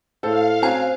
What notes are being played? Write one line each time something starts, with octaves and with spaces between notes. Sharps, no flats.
A2 A4 C5 F5
C4 C#4 F#4 C5 G#5